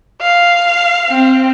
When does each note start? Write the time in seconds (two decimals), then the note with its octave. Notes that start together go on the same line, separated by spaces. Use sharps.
0.22 F5
1.09 C4